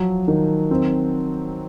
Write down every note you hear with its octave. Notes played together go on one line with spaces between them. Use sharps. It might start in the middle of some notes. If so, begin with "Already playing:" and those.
Already playing: F3 F#3
D#3
C4